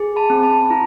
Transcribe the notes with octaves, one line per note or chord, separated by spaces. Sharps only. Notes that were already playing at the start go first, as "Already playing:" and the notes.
Already playing: G#4
A5 B5
C4
A5 B5
E4 A#5